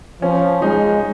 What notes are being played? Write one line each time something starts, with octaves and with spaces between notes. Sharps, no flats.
F3 C#4
G#3 D#4